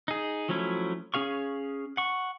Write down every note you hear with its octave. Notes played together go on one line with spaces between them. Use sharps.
D#4 G#4
F3 F#3 A3 C#4 E4
C#4 G#4 F5 C#6
F#5 C#6